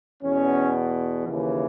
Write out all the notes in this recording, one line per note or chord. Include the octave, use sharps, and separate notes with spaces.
E2 B2 C#4
D#2 C#3 E3